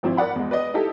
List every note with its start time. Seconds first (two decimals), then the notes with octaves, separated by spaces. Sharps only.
0.03 G#1 F3 C4 E4
0.17 A#4 D5 F#5 B5
0.35 E2 G#3
0.51 B4 D5 D#5
0.74 D#4 E4 G4 A4